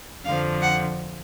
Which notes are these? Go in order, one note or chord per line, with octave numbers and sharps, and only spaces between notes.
F2 D3 F3 F5
F#5